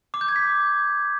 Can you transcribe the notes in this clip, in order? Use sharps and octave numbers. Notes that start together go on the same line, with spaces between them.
D6
G6
G#6
B6